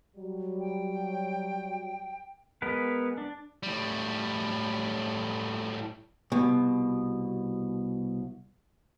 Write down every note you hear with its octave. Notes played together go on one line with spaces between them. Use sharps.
F#3 G3
G5
G#3 B3 A#4 B4
D4
A2 G3
C2 B2